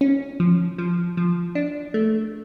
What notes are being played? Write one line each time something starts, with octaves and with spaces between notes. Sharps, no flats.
C#4
F3
F3
F3
D4
A3